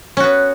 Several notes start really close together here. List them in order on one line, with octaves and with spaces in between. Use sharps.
C#4 F#4 B3